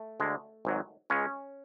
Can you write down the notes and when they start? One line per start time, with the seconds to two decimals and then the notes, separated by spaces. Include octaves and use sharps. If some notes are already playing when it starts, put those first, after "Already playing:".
Already playing: A3
0.20 D2 D3 G#3
0.65 G#1 G#2 F#3
1.10 C#2 C#3 G#3 C#4